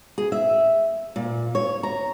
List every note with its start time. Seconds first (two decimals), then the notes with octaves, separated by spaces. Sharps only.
0.18 G#4
0.32 E5
1.16 A#2
1.55 C#5
1.83 A#5